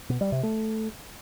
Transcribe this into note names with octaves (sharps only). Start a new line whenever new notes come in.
B2
G3
C3
A3